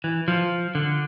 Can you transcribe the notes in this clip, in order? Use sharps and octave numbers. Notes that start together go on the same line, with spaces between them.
E3
F3
D3